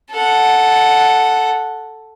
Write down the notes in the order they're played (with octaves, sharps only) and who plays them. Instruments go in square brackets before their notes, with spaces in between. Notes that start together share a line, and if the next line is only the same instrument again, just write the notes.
[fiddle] A4 F#5